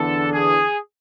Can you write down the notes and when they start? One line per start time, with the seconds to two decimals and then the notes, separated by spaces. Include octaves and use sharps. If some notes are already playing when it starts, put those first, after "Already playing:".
Already playing: E2 D3 A4
0.32 G#4